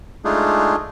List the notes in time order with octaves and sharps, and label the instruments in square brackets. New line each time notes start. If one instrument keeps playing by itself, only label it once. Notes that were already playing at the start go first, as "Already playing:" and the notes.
[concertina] G#3 A3 D4 D#4 F4 G#4